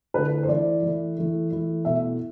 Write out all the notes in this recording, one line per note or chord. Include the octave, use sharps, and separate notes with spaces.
D3 A3 E4 B4
C5
E3 A3 E4 D5
E3 A3 E4
E3 A3 E4
E3 A3 E4
B2 A3 E4 E5